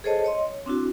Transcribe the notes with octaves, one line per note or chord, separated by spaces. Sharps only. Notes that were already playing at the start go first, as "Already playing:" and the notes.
G#4 A4 C5 C#5 D#5 A5
C#5 D#5 C6
C#5
C4 D4 E4 F#4